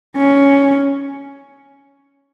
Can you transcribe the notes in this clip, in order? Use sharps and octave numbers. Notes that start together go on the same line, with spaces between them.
C#4